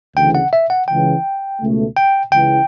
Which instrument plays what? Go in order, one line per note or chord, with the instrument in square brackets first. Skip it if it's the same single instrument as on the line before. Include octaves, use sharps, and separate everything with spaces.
[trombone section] D2 C#3 E3 [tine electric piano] G5
[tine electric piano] F#5
E5
F#5
[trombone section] C#2 C#3 E3 [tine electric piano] G5
[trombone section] C#2 B2 A3
[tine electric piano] G5
[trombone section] C#2 C#3 E3 [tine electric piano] G5